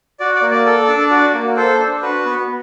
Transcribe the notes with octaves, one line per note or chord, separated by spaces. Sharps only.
F#4 D5
D5
A#3
D5
A4
D4
F#4
A#3
A4 C5
D4
F#4 B4
B3